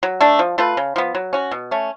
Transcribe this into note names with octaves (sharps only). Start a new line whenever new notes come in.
F#3
A3 D4
F3
A3 F4 B4
C#3
F3 B3
F#3
C#4 F#4
B2
A3 C#4